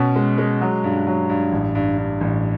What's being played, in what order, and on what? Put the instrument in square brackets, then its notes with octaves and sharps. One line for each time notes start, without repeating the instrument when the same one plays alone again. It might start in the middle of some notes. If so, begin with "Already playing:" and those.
Already playing: [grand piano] B2 C#4
G#3
G#3
F#3
G2
F#3
G2
A1
G2
G2
A1